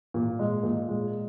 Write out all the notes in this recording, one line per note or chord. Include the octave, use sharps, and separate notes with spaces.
A#2
G#3
A#2
G#3